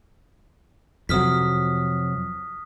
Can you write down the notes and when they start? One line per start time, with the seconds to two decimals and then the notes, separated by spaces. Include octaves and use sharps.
1.09 F2 C3 F#3 D#6 F6 B6